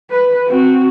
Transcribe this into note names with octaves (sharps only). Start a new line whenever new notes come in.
B4
C4 F#4